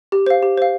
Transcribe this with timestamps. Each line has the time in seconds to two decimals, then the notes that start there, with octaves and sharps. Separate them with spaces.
0.12 G4
0.26 C5 F5
0.43 G4
0.58 C5 F5